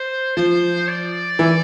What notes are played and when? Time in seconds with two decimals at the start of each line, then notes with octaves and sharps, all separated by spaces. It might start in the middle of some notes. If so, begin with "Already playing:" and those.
Already playing: C5
0.37 F3 C5
0.88 D5
1.39 E3